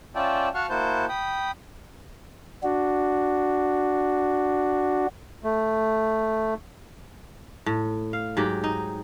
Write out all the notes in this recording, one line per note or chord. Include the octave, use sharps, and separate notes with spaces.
C#4 F4 D5 E5 G5 A5
F#4 F5 F#5 A5 C#6 F6
A#3 E4 F#4 C5 A5 G6
G5 B5 D#6
D4 F#4
A3
A2
F5
G#2 F#3 G4
D#4